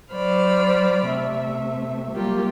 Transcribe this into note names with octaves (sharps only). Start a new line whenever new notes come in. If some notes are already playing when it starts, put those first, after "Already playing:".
F#3 C5 D5 B5 F6
C3 A3 E5
F#3 G3 A#3 F4 G4